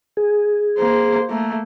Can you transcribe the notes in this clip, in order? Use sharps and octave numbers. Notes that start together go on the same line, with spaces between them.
G#4
A#3 C5
A3 A#3